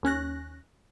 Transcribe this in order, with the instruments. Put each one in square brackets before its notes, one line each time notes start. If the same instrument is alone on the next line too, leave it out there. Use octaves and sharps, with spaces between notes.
[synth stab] D#2 C#4 F#6 A#6